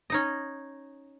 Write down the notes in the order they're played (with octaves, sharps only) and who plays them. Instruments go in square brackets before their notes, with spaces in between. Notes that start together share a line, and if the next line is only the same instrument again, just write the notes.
[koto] C#4 D#4 D#5